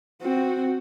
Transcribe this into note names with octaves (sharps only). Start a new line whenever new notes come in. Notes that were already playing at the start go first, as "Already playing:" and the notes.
C4 F#4